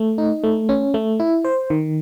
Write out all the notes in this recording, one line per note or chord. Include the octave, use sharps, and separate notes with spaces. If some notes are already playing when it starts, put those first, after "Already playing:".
Already playing: A3
D#4
A3
C#4
A3
E4
C5
D#3